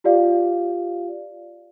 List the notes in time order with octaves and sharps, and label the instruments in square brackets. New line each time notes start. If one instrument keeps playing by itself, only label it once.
[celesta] F4 G4 D5 F5